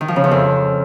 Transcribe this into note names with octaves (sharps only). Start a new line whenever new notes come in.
D#3
F3
C#3
E2
F2